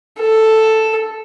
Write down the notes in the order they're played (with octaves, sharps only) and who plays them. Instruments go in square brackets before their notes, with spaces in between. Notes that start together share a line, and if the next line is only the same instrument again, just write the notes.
[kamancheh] A4